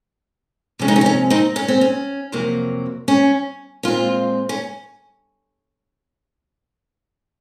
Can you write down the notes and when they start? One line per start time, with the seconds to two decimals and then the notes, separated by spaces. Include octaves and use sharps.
0.79 C3 F3 G#3 C4 C#4
0.88 D#4
0.96 C#4
1.01 D#4
1.06 C#4
1.30 C4 D#4
1.56 C#4
1.68 C4
1.81 C#4
2.32 F2 C3 F#3 A#3
3.08 C#4
3.83 A#2 G#3 C4 C#4 F4
4.49 C#4